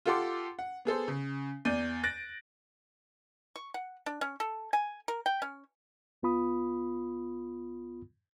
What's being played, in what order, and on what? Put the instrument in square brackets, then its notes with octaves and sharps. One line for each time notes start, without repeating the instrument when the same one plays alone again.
[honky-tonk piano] F4 G4 A4 F#5 C6 D6
F#5
B3 G#4 A4 C5
C#3
E2 D5 G6 D#7
F#6 A6 A#6 D7
[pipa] C#6
F#5
D4
C#4
A4
G#5
A#4
G5
C#4
[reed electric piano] C2 B3 F4 B5 D#6